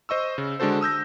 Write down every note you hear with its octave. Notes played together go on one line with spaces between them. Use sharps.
C5 D#5 C#6 E6
C#3
D3 G#3 D4 F#4 A4 C5
D#6 E6 G6 A#6